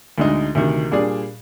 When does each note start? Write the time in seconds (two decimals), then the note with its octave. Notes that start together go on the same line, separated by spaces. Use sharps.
0.18 D2 D3 G#3 D#4
0.55 D2 C3 D#3
0.91 A#2 G3 D4 G#4 D5